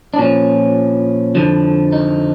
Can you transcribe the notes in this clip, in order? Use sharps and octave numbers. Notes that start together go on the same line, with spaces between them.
D4
A#2 F3 C#4
F2 D3 F3
D#4